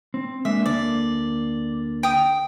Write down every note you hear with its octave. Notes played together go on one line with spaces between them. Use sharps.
C4
G#3 A#3 D4 E5
D2 D3 A#3 D5
G5 D#6